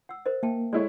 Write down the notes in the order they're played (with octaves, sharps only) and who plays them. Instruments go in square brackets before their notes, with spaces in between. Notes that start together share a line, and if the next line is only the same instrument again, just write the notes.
[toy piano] F#5 E6
A#4 C5 D#5
[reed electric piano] A#3 [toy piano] E5 G5 A5
[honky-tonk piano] G#3 E4 C#5 [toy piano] A4 D5